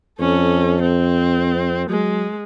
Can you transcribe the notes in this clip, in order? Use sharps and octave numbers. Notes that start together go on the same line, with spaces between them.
F2 C#4 A4
C4
F#3 G#3